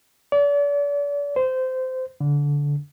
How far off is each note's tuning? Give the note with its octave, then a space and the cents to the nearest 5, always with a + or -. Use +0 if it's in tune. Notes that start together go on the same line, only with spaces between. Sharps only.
D5 -40
C5 -20
D3 -20